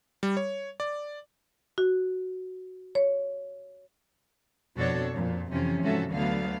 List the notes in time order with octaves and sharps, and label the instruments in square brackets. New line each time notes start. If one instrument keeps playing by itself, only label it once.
[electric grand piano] G3
C#5
D5
[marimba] F#4
C#5
[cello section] F2 B2 D4 F#4 A4 C#5
F2 A#2
F2 C3 E3 F3 C#4
G#2 F3 C#4 F#4 A4 E5
D2 D3 F#3 A3 B3 F5